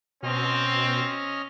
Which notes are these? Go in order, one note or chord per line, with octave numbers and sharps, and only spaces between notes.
B2 C4 C#4 D#5 F6